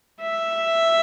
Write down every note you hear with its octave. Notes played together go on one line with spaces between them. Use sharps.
E5